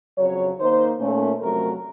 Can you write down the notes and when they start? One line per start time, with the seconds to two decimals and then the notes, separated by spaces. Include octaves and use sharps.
0.18 F2 C#3 F#3 C#5
0.58 D#3 A#3 D#4 C5
1.00 A#2 A3 C#4
1.41 F2 C3 F#3 A3 A#4